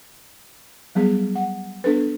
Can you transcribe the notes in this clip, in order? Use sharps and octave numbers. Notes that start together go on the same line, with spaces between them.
F#3 G3 B3 G#4
F#5
B3 D4 A4 B4